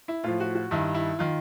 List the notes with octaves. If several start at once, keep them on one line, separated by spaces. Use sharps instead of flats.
E4
A2 F3 F4
F#4
F#4
G2 D#3 E4
E4
D#3 F4